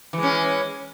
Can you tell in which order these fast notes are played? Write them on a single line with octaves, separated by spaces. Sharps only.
E3 G#3 C#4